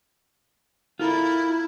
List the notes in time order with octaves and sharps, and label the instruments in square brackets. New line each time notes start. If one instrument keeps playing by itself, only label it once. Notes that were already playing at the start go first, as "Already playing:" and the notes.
[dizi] E4 [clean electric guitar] F4 A4 A#4